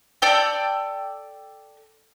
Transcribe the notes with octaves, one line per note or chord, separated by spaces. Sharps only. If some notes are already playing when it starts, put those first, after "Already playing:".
A4 D5 G5 E6